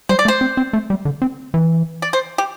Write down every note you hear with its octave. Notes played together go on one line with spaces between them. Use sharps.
G3 C5
D5
A3
C5
C4
C4
A3
G3
D3
C4
E3
D5
C5
G4